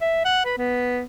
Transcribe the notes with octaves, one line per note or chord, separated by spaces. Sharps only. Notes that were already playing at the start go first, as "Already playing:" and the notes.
E5
F#5
B4
B3